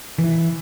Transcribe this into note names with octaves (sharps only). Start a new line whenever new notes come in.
E3